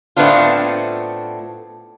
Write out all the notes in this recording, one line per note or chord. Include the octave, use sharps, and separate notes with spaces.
A2 A3 B3 C4 D4 F4